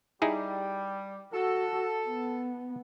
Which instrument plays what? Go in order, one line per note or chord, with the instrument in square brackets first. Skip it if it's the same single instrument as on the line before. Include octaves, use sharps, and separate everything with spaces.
[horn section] G3 [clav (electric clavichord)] D#4 E4 G#4
[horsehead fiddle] F#4 [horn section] A4
[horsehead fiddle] B3